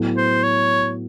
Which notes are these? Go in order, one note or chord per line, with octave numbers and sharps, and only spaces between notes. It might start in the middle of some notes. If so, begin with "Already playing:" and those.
Already playing: A2 F#3 B3 E4 A4
C5
C#5